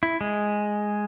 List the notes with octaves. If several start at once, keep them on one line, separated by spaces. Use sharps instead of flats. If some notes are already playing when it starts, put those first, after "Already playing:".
E4
G#3